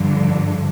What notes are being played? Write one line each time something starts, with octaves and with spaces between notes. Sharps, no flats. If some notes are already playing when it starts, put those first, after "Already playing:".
Already playing: G2 D3 F3